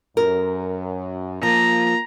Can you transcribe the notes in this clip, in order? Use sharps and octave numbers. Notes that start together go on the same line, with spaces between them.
F#2 A#4
F3 A#3 A#5